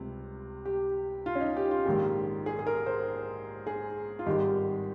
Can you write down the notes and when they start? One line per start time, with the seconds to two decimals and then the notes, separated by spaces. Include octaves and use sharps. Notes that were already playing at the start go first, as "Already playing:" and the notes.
Already playing: C#2 C3 G3 C4
0.65 G4
1.26 F4
1.35 C#4
1.41 D#4
1.57 G4
1.71 F4
1.86 A#1 G#2 D#3 G#3 G4
2.46 G#4
2.59 G#4
2.67 A#4
2.86 C5
3.67 G#4
4.19 F4
4.26 G#1 G2 D#3 G#3 G4